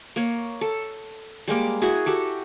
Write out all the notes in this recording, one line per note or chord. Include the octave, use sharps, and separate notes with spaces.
A#3 C#5
A4
G3 G#3 A#3 D6
E4 F#4 G#4
F#4 G4 A4